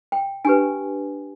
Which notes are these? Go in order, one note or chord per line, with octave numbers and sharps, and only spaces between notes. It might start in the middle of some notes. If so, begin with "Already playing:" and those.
G5
D4 G4 B4 G#5